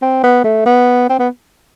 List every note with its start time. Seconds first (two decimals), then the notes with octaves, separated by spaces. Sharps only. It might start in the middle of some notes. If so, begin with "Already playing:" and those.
0.02 C4
0.23 B3
0.44 A3
0.65 B3
1.09 C4
1.19 B3